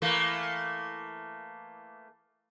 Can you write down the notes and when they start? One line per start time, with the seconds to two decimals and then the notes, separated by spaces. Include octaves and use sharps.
0.02 E3 A3 A#3